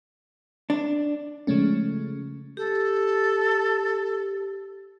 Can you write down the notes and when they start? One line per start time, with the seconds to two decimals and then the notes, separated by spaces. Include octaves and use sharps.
0.70 D4
1.47 C#3 F3 G#3 A3 C#4
2.57 G4 A4